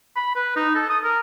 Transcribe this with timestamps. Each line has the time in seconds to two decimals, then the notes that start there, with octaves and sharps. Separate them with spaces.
0.16 B5
0.35 B4
0.56 D#4
0.75 A4
0.89 D#6
1.04 A#4